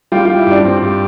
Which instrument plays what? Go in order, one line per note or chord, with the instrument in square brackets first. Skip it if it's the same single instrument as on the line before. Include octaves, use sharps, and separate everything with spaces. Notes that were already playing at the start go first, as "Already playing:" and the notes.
[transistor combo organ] G3 [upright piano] F4
[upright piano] F4
[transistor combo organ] G3
[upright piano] E4
[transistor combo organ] G2
[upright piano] D4
[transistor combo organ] G2 [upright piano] C4
[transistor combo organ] G2